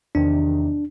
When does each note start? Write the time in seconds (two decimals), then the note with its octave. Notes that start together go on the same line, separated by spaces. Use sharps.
0.15 E2 C3 D#3 D4